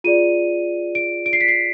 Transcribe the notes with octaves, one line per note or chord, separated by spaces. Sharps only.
F4 G#4 D5 D#7
D7
D7
C7
B6
C7